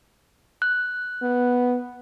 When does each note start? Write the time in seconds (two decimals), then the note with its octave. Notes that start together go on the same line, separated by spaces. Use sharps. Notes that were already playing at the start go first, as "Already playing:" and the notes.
0.62 F#6
1.22 B3